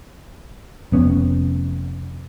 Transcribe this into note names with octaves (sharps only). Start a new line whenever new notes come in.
F1 B3 C#4